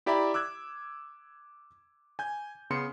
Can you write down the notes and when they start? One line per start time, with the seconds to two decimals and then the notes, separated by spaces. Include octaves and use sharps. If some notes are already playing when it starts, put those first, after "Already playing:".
0.06 E4 G4 D5 E5 A#5 B5
0.34 D6 E6 F#6 G#6
2.19 G#5 G6
2.70 C#3 B3 C6 C#7